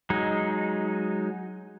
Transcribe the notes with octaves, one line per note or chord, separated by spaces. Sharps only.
F#3 G#3 D#4